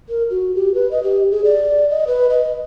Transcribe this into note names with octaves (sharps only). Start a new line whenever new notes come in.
A#4
F#4
G4
B4
D#5
G4
G#4
D5
D#5
B4
D#5